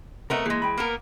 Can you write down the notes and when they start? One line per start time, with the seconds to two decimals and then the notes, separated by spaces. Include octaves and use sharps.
0.30 C3 A3 B3 A#4 D#5
0.46 E3 G#3 A#3 G#4
0.62 G5 B5
0.78 A#3 B3 A#4